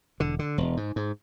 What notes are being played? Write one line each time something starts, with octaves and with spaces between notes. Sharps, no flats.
E1 D3
D3
E1
G#2
G#2